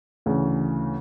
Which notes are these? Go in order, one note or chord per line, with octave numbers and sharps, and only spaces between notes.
D2 C#3 E3